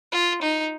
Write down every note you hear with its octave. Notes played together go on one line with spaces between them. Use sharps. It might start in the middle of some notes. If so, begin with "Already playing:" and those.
F4
D#4